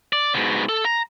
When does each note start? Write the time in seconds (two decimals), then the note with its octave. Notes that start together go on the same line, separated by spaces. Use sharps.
0.13 D5
0.34 G#2 B2
0.69 A4
0.85 A#5